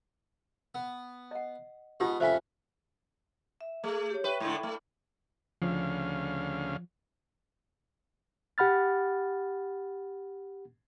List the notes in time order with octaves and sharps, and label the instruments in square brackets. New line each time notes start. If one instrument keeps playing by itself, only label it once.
[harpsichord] B3
[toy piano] D#5 F#5
[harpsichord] G#2 B3 [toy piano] D#4 F4 G4
[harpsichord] F2 A2 C#4 [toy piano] C5 F5 G#5 [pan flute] E5
[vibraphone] E5
[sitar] A3 [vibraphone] G#4
[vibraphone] G4 C#5
[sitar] B4 [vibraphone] E5 G5 C#6
[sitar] G#2 D3
A3
[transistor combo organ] D2 C#3 F5 [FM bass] F3
[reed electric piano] G4 F#5 B5 F6 A6